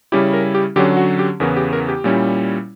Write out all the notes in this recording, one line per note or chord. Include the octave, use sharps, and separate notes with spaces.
C#3 G3 C#4 E4 G4
A#4
G4
D3 F#3 C#4 G4
F#4
G4
E2 C#3 E3 B3 E4 A#4
G4
A#4
G4
A#2 G3 C#4 E4